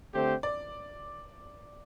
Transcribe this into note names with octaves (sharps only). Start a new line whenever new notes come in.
D3 A3 C4 G4 C5
D5